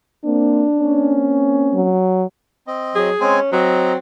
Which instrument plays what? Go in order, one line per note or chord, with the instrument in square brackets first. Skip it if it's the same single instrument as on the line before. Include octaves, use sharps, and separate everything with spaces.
[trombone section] A#3 C4 [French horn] D4
[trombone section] A#3 C4 C#4
[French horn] F#3
[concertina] C4 D#5
[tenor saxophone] F#3 [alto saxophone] G#4
[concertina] G#3 C4 G#5 [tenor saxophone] C#4
[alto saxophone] F#3 [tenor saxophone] C4 [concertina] D#5 A#5